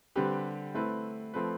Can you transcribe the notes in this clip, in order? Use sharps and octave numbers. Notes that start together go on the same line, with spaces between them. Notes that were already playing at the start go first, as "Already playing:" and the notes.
D3 G3 C4 G4 B4
A3 C4 E4 B4
F3 A3 C4 F4 B4